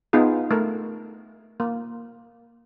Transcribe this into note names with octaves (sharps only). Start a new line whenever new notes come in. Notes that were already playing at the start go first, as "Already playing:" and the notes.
B3 D#4 F4 G#4
A3 A#4
A#3